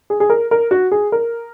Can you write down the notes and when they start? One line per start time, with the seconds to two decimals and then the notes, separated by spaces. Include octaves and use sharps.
0.10 G#4
0.20 G#4
0.30 A#4
0.51 A#4
0.71 F#4
0.92 G#4
1.12 A#4